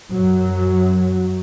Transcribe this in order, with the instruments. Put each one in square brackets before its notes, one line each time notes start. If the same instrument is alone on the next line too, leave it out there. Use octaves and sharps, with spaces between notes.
[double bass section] F#2 F#3